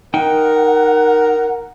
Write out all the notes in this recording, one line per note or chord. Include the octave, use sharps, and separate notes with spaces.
D#4 A#4 F#5 G5